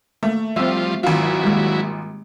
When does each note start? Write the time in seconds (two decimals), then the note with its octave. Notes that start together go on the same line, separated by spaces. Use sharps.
0.23 A3 A#3
0.56 F3 G3 C4 F4 E5
1.03 G#1 F#3 E4 F4
1.44 G3 G#3 A#3